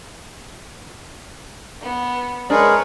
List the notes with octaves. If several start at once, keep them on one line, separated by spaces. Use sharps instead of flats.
B3
G#3 D4 G#4 A#4 B4 C#5